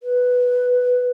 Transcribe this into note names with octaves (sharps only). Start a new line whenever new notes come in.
B4